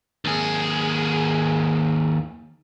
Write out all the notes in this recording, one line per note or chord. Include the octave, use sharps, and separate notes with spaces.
D#2 G#4